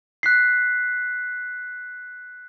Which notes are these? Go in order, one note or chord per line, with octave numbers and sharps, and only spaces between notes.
F#6 B6 C7